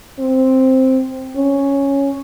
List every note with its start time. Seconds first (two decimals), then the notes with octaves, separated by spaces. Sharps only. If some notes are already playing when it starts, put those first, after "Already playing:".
0.19 C4
1.36 C#4